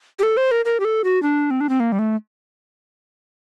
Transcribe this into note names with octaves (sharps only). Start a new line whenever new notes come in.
G4
A4
C5
A#4
A#4
G4
A4
F#4
D4
C4
D4
C4
A#3
G3
A3